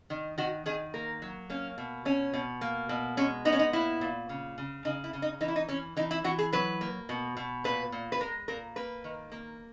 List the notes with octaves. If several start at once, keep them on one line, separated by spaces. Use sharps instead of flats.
D#3
D#3 F#4
D#3 G#4
A#3 A#4
F#3
A#3 C#4
B2
B2 C#4
B2
A#3
B2
G#3 C#4
B3 D#4
C#4
D#4
A#2 E4
A#2
C#3
C#3
C#3 D#4
E4
C#3
D#4
E3 D#4
E4
D#4
E3 C#4
E3 D#4
E4
E3 F#4
G#4
F#3 B4
A#3
B2
B2
A#2 B4
A#2
B4
G#3 A#4
A#2 A#4
A#3 B4
D#3
A#3